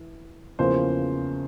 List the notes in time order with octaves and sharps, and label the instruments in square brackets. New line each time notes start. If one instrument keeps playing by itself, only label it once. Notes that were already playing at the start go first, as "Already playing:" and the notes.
Already playing: [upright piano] E3
E2 C#3 F3 A#3 C5